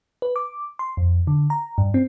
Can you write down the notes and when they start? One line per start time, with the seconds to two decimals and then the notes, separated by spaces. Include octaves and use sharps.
0.22 B4
0.36 D6
0.79 C6
0.97 F2
1.27 D3
1.50 A#5
1.78 G2
1.94 C4